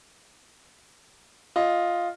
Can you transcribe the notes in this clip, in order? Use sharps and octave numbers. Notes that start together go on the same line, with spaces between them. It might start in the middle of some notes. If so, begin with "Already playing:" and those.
F4 D#5